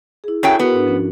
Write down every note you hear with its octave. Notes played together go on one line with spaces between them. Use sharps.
E4 G#4
F#2 F#3 E4 A4 G5
B3 F#4 A#4
G#2 D4
F3 C#4